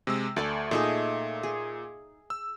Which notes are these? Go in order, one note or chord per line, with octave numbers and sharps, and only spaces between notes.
C3 G#3 E6
D2 A3 D5 G#5
A#2 A3 D#4 G#4
G#4
E6